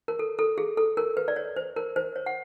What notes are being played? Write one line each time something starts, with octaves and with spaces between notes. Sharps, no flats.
A#4
A4
A4
G#4
A4
A#4
B4
D5
C#5
C5
A#4
C5
C#5
F#5